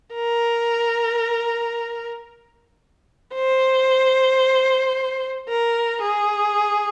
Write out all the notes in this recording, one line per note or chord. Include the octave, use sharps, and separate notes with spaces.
A#4
C5
A#4
G#4